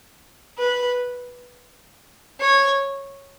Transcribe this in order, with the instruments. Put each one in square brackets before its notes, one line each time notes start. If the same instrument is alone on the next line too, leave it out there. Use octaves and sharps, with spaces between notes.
[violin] B4
C#5